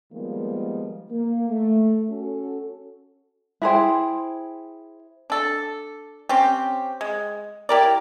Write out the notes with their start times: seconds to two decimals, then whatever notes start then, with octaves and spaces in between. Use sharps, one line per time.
0.13 D#3 F3 G3 G#3 A#3 B3
1.11 A#3
1.49 A3
2.09 C#4 F#4 A4
3.62 E4 G#4 C5 G5
5.30 D4 A4
6.29 C4 C#4 G4
7.01 G#3
7.69 E4 G4 A#4 D5